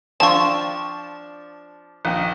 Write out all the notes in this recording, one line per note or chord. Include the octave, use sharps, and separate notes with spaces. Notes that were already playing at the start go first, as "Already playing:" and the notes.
F3 C4 D4 F4 A5 C#6
A#1 D#3